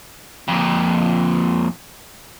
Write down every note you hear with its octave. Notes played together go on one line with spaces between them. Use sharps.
F2 A#2